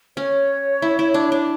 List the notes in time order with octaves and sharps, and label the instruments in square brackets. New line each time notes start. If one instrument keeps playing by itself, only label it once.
[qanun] C#4 [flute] C#5
[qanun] E4
E4
D4
D4